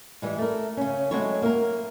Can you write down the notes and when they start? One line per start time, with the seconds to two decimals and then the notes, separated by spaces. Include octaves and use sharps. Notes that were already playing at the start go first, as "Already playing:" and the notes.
0.22 E3 G3 G#3
0.38 A3 A#4
0.77 C#3 C#4
1.11 F#3 G#3 A3 C4 E4 C#5
1.42 A#3 A#4